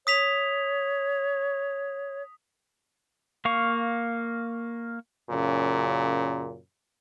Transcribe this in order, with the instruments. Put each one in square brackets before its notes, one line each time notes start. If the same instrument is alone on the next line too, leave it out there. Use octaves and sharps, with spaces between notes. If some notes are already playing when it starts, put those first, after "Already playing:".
[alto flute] C#5 [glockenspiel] D#6 B6 F7
[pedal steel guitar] A#3 F5 C#6
[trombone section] F#2 A#2 C#3